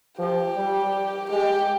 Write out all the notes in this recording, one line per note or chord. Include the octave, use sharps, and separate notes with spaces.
F3 G4
G3
G#3 G4